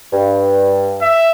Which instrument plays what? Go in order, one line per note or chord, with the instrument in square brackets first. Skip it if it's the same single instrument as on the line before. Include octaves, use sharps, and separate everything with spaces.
[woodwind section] G2
[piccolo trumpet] E5